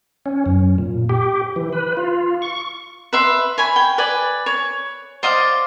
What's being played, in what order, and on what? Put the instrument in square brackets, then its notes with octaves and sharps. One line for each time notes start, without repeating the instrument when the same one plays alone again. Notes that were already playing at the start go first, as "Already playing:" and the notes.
[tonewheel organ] C#4
F#2
A#2
G4
E3
B4
F4
C#6
[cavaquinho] B4 E5 C6
C#5 G#5 B5
G5
B4 D5 G#5
C#5
C5 D5 D#5 F5